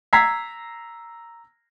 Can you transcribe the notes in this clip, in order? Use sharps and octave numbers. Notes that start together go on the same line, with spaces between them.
A#5 E6 G#6 B6 C7